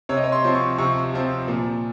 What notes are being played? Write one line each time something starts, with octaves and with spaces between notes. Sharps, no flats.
C3 C#5
D#5
C#5
C6
F3 C4
C#6
C3 C#6
F3 C4
A#2